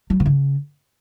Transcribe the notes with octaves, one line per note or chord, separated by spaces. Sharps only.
F#3
B2
C#3